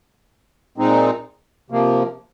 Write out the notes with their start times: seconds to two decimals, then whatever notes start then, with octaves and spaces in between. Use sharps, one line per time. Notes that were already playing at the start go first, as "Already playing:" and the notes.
0.78 A#2 G#3 C4 D#4
1.70 C3 F3 A#3